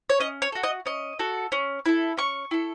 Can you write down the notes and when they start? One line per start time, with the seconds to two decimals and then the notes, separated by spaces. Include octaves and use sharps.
0.10 C#5
0.20 C#4 D#5
0.42 C#5
0.52 F#4 A4
0.63 D#5
0.86 C#4 D#5
1.19 F#4 A4
1.52 C#4
1.86 E4 A4
2.17 C#4 C#6
2.51 E4 A4